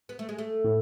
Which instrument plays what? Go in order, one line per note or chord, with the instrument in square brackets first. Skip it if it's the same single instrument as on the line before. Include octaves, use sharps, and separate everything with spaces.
[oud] B3
A3
G#3
A3
[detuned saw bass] A2